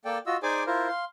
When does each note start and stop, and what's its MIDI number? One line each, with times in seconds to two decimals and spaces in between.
0.05 0.18 58
0.05 0.18 69
0.05 0.18 74
0.05 0.18 79
0.26 0.37 65
0.26 0.37 66
0.26 0.37 75
0.26 0.37 88
0.43 0.63 63
0.43 0.63 68
0.43 0.63 72
0.43 0.63 74
0.43 0.63 80
0.43 0.63 86
0.67 0.88 64
0.67 0.88 65
0.67 0.88 70
0.67 0.88 72
0.88 1.05 77
0.88 1.05 84